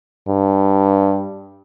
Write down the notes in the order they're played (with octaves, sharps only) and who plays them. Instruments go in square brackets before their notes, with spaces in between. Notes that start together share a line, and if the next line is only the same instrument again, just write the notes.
[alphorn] G2